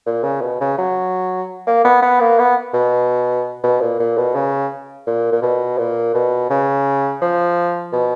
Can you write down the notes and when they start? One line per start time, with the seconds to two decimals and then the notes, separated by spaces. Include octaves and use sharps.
0.07 A#2
0.23 C#3
0.42 B2
0.60 C#3
0.78 F#3
1.67 A#3
1.85 B3
2.02 B3
2.21 A#3
2.39 B3
2.74 B2
3.64 B2
3.81 A#2
4.00 A#2
4.18 B2
4.35 C#3
5.07 A#2
5.32 A#2
5.42 B2
5.78 A#2
6.14 B2
6.50 C#3
7.22 F3
7.93 B2